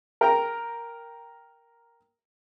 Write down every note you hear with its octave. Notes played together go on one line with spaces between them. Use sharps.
A#4 G5 A#5